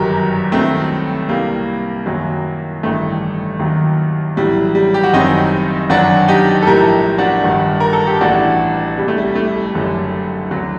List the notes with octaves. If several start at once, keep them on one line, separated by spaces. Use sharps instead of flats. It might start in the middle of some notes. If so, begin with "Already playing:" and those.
Already playing: G1 F#2 D#3 F#3 G4 A#4
C2 C3 D#3 F#3 A3 C4
C2 C3 G3 A#3
F#2 D#3 F#3
A1 G2 D#3 A3
D#2 D#3 F#3
A1 A2 F#3 G3
G3
G4
F#4
F#1 F#2 D#3 G3 C4 D#4
G1 F#2 D#3 F#3 D4 F#4
D#4 G4
A4
A#1 A2 G3 G4 A#4
D4 F#4
G1 G2 D#3 G3
A#4
A4
G4
A1 A2 G3 D4 F#4
C2 C3 G3
A3
G3
A3
F#1 F#2 D3 G3
D2 D3 F#3